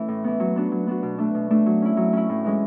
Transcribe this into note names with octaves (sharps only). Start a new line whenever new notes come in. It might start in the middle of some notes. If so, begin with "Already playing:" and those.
Already playing: E3 A3 C#4 E4
A2
E3 B3
F#3
B3 D4 F#4
F#3
B3 D4 F#4
B2
A3 D4
B2
A3 D4
F#3
C#4 E4
F#3
C#4 E4
A2
E3 G#3 C#4